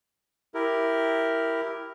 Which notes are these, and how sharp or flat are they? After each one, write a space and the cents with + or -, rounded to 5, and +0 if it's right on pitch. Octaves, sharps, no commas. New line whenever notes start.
E4 +0 G4 +0 A#4 +0